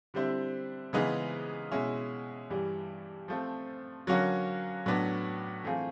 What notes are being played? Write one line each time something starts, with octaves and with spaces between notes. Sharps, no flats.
D3 G3 C4 E4
C#3 E3 G#3 B3 D#4
B2 G#3 C#4 E4
G2 E3 G3
F3 A3 C4
D3 F#3 A#3 C#4 F#4
A2 F#3 B3 D4
E3 A3 C4 F4 G#4